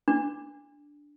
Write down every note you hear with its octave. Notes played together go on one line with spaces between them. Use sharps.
D4